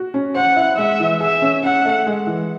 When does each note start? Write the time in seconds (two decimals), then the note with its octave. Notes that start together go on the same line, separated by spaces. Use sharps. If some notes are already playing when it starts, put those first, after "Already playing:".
Already playing: F#4
0.14 C#4
0.35 C5 F#5
0.56 E4
0.77 G#3 E5
1.00 E3
1.20 G#4 E5
1.42 C#4
1.63 C#4 F#5
1.85 A3
2.07 G#3
2.27 E3